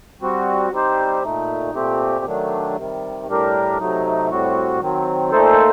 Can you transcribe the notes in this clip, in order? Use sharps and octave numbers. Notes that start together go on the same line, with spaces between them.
G3 C4 F#4
G3 C4 D#4 G4 C5
A#2 A3 D#4
A#2 A3 C4 G4
D#3 F#3 A3 D4
C3 D#3 G3
A2 G3 D4 G4 A#4
C3 F#3 A3 D#4
A2 G3 C4 F#4
D#3 F#3 C4
A#2 A3 D#4 A4 C5